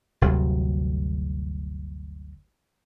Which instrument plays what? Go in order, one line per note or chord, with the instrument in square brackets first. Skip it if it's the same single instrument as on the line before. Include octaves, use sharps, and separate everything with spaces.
[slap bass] G1 D2 C3 F#3